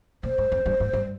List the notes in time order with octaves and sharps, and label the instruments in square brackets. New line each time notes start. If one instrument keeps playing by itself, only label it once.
[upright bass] A#2 [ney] C5
[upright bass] G#2
F2
G2
G#2
G2